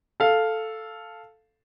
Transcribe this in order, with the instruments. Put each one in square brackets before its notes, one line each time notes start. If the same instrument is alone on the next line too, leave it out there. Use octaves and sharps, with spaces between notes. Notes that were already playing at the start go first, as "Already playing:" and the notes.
[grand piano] A4 F5